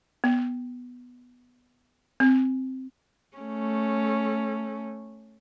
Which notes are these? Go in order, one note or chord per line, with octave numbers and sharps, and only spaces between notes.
B3
C4
A3 C#4